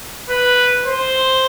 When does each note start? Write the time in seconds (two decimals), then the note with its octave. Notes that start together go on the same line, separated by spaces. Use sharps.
0.30 B4
0.85 C5